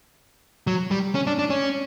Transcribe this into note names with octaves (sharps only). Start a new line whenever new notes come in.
F#3
G3
C#4
D4
D4
C#4